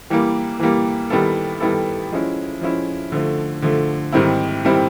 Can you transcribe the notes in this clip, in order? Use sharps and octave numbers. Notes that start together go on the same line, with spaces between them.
E3 G3 A#3
E3 G3 A#3
D#3 G3 B3 E4 A4
D#3 G3 B3 E4 A4
F3 G#3 C#4 E4
F3 G#3 C#4 E4
D3 F3 A3
D3 F3 A3
G#2 D#3 G3 C4 E4
D#3 G3 C4 E4